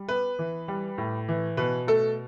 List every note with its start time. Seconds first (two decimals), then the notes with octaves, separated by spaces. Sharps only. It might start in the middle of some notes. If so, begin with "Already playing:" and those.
Already playing: G3
0.09 B3 B4
0.39 E3
0.68 G3
0.98 A2
1.29 E3
1.57 B2 B4
1.87 A3 A4